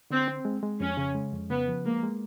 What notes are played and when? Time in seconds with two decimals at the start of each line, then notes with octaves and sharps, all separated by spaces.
0.10 D3 C4
0.28 C4
0.45 G#3
0.63 G#3
0.80 F2 C#4
0.97 C#3
1.15 G#3
1.33 F2
1.50 C#3 B3
1.68 F3
1.85 G#3 A#3
2.03 G#3